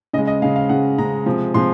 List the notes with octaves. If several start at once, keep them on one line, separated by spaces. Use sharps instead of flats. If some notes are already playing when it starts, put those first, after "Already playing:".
C#3 G#3 D#5
D#5
C#3 G#3 F5
F5
C#3 G#3 F#5
C#3 G#3 A#5
C3 F3 G#3
C3 F3 G#3 C6